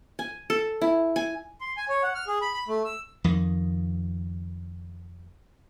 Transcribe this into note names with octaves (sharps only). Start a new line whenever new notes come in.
G#5
A4
E4
G#5
C6
G#5
C#5
F#5
F6
G#4
B5
B5
A3
E6
F2 D#3